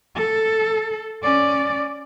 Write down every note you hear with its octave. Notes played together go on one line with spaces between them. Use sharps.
A4
C#4 D5